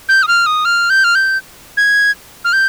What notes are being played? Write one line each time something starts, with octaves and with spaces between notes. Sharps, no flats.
G6
D#6
F6
D#6
F6
G6
F6
G6
G#6
F6
G6